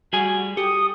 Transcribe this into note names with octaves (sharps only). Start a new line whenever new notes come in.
G3 F#4 G#4 G#5
G4 A4 D#6